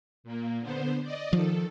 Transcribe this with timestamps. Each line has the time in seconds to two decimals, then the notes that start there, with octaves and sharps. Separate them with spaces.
0.24 A#2 A#3
0.60 D3 B3 C5
1.04 D5 D#5
1.33 D#3 F3 A4